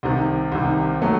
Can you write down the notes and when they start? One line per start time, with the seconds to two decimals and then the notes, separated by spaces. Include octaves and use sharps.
0.03 C2 C3 D#3
0.52 C2 C3 D#3
1.02 F#3 A3